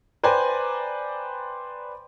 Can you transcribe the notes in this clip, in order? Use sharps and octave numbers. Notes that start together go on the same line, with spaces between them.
B4 C5 D5 G5 G#5 A#5